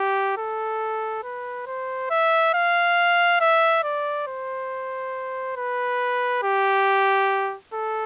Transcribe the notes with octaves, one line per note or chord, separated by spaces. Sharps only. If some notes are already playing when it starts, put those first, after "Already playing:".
Already playing: G4
A4
B4
C5
E5
F5
E5
D5
C5
B4
G4
A4